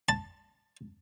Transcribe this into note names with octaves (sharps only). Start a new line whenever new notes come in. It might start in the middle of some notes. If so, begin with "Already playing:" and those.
A5